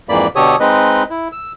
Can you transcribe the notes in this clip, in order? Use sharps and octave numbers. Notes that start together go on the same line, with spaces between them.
F2 G#2 E3 A#3 D5 B5
B2 D3 G4 A4 C#5 D#6
G#3 C4 D#4 B4 D#5
E4
E6